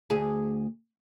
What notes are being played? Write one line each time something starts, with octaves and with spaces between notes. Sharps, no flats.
D2 G#4